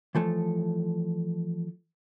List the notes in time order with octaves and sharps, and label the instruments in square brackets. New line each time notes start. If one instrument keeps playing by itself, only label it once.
[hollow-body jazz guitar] E3 F3 A3